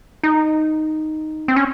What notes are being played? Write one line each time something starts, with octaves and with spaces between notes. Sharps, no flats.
D#4
C4
C#4